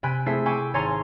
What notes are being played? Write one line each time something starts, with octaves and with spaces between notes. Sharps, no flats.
C3 G5 G#5 B5 F#6
A3 C4 E4 G#4 C5 E5
G5 G#5 B5 C#6 D6 E6
G#1 C#5 G#5 A#5 C6 A6